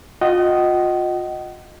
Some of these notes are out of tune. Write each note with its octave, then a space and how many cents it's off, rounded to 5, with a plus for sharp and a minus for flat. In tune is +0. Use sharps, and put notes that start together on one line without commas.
F4 +35 D#5 -5 F#5 +45